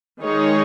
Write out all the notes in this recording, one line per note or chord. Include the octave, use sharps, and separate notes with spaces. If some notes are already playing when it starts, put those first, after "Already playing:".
D#3 G#3 D#4 G#4 C#5